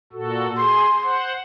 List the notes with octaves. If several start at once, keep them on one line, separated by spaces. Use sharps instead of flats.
A#2 F#4 A4
G#4 C6
C5 F#5